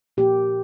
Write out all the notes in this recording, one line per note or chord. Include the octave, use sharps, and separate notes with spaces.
A#2 F3 A#3 G4